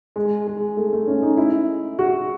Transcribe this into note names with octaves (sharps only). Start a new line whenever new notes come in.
G#3
G#3
A3
A3
C#4
D#4
E4
F#4